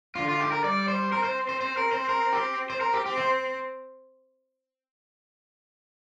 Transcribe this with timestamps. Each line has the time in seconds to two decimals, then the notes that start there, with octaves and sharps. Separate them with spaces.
0.15 D3 F4
0.28 F4
0.40 G4
0.52 A#4
0.64 G3 D5
0.88 C5
1.12 C4 A#4
1.24 C5
1.49 C5
1.61 C5
1.77 A#4
1.92 C5
2.09 A#4
2.33 G4
2.70 C5
2.81 A#4
2.93 G4
3.05 C4 G4
3.17 C5